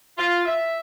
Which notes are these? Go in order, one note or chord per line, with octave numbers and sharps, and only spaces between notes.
F4
E5